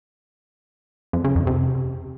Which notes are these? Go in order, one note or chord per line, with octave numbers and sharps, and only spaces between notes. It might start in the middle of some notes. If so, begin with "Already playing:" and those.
F2
C#3
F2
C3